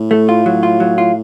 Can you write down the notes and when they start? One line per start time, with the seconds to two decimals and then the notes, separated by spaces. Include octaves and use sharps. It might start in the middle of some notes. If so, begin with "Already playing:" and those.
Already playing: A2
0.11 A3
0.29 F4
0.46 F#3
0.63 F4
0.80 F#3
0.98 F4